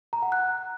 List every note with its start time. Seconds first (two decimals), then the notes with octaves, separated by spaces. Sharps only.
0.13 A#5
0.22 F#5
0.32 F#6